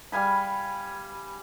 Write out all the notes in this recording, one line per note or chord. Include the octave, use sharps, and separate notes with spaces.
G3 F5 G#5 B5